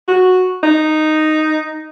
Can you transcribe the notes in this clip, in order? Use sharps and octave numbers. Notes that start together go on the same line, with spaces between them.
F#4
D#4